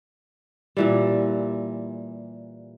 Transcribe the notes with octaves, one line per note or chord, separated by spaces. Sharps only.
A#2 E3 G3